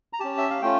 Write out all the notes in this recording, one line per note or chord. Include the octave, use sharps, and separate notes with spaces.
A#5
C#4 G4 A5
E5
F5
A3 C#4 F4 G5